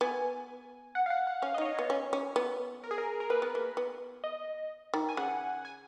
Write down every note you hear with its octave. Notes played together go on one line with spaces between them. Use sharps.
B3 G#5
F#5
F5
F#5
F#5
C#4 F5
D#5
D#4 C#5
D#5
B3 C#5
C#4
C#4
B3
A#4
G#4
A#4
A#4
A#3 B4
B3
A#3
B3
D#5
D#3
G#5
C#3 F#5
G#5